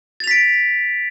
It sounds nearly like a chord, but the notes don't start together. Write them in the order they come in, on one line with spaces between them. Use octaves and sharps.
A6 F7 B6 D7